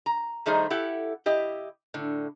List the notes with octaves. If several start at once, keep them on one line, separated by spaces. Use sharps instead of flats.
A#5
D#3 G3 A3 D#4 G#4 C5
E4 G4 A4 F#5
E4 G4 D#5
A2 D3